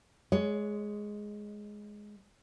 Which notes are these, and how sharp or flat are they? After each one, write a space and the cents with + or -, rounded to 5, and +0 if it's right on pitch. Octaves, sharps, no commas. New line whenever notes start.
G#3 +5 C#5 +25